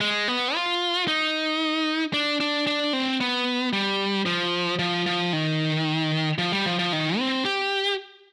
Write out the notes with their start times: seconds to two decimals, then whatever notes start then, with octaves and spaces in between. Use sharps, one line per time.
0.01 G#3
0.28 B3
0.55 F4
1.08 D#4
2.13 D4
2.41 D4
2.67 D4
2.93 C4
3.21 B3
3.73 G3
4.26 F3
4.79 F3
5.06 F3
5.33 D#3
6.38 F3
6.52 G3
6.66 F3
6.79 F3
6.93 D#3
7.18 C4
7.45 G4